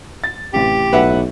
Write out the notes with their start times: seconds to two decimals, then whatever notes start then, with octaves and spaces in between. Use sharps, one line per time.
0.24 A6
0.53 A1 C3 G4
0.93 B1 B4 E5 F#5